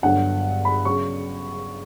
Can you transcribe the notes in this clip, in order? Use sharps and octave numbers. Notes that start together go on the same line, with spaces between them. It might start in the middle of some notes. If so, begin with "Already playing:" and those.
G1 G2 D3 F#3 F#5
B5
C#3 F#3 C#6